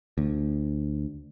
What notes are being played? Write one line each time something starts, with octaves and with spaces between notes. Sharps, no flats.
D2